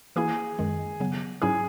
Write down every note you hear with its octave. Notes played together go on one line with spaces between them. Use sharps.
E3 A#3 E4 G#4
F#2 D#3 G#3
C#3 F#3 B3
G#2 F#3 C#4 E4 G#4